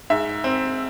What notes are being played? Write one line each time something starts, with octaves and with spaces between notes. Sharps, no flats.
G#2 E5
C4